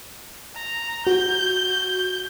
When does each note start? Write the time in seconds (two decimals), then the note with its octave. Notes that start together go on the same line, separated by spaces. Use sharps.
0.55 A#5
1.07 F#4 G6